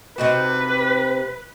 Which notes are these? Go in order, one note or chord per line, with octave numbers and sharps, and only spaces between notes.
C3 D#4 F#4 B4